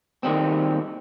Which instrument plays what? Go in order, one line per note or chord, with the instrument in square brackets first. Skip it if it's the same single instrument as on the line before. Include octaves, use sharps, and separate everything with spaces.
[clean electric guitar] D#2 D#3 G3 C4